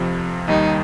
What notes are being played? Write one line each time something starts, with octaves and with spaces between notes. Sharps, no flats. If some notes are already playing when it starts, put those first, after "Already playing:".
Already playing: F2 C3 F3
D#2 D#3 G3 D#4